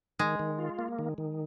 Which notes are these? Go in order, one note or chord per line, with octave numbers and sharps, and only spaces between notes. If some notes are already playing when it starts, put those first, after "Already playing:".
D#3 G#3
D#3
F4
A#3
D#3
D#3